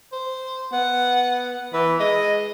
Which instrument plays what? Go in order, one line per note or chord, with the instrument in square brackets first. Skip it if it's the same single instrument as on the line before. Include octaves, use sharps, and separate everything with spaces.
[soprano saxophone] C5
[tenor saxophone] B3 [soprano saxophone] F#5
[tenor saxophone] E3 [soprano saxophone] B4
[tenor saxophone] G#3 [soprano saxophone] D#5